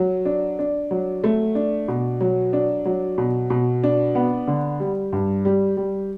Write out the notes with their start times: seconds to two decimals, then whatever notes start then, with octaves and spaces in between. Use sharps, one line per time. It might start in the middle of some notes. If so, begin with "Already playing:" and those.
Already playing: F#3
0.25 D4
0.59 D4
0.91 F#3
1.24 A3
1.55 D4
1.88 B2
2.21 F#3
2.53 D4
2.85 F#3
3.18 B2
3.50 B2
3.84 D4
4.15 B3
4.48 D3
4.80 G3
5.13 G2
5.45 G3
5.77 G3